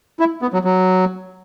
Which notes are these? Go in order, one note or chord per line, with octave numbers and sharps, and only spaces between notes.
E4
B3
F#3
F#3